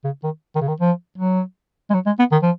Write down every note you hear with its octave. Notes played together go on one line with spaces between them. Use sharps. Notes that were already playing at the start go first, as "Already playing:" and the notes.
C#3
D#3
D#3
C#3
D#3
F3
F#3
G#3
F#3
G#3
B3
D#3
F3